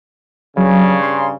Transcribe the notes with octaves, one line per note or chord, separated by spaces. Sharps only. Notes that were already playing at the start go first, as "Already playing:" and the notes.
G2 C#3 F#3
C6